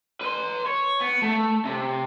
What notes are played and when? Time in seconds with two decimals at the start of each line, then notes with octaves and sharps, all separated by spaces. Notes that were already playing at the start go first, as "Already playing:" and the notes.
0.21 B4 C6
0.66 C#5
1.01 B3
1.22 A3
1.65 C3